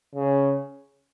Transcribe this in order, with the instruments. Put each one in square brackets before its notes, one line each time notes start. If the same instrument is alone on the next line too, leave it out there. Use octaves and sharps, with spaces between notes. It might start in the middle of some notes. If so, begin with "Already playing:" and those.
[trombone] C#3